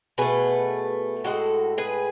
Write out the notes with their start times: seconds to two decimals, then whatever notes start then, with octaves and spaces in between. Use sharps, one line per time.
0.18 B2 A3 G#4 B4
1.24 A2 G#3 F#4 A4
1.78 G#4 B4